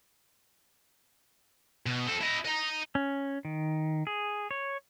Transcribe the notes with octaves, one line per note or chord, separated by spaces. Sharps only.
B2
C4 A4
E4 D#5
D#5 A#5
C#4
D#3
G#4
C#5